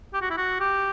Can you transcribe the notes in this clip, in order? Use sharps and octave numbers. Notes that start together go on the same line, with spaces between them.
G4
F#4
E4
F#4
G4